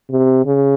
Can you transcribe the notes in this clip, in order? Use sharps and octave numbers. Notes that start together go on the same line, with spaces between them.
C3
C#3